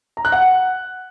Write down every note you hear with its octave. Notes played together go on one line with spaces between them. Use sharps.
A#5
F#6
F#5